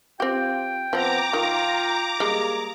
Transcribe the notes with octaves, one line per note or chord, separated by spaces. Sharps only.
C4 F4 G4 G5
F3 B3 C4 A#5 D6
D#3 F4
G3 G#3 A#3 G#4